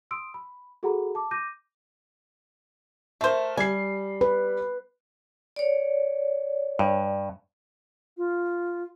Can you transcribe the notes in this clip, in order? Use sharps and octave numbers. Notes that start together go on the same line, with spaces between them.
C6 D#6 E6 D7
B5
F#4 G#4 A4 F#5 A#5 B5
A5 D6
D6 G6 A#6 D#7
A3 A#4 C5 E5
G3 G#5 C7
B4
C#5 D5
G2
F4